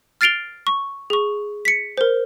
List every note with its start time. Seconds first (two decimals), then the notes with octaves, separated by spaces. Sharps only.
0.21 F6 A6 C7 D7 F7 G7
0.67 C#6
1.10 G#4 C#6
1.65 B6 C#7
1.97 A#4 C5